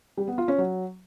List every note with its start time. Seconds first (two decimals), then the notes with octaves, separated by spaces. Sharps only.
0.17 G3
0.28 B3
0.38 F4
0.48 C#4
0.58 F#3